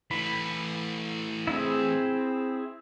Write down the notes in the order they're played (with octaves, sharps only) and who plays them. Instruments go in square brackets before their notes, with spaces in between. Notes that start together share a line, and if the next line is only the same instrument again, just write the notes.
[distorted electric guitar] E3 A3 [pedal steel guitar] B5
[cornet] C4 [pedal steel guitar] E4 G#4